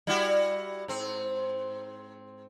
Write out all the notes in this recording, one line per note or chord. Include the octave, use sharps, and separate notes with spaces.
G3 E4 F#4
G#2 C4